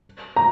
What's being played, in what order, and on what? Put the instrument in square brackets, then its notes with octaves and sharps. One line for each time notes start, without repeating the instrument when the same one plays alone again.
[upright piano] A#5